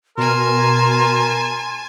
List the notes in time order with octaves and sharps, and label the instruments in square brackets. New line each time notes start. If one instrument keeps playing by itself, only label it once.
[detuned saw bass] B2 [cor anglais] A#4 [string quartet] G#5 A5 [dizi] C6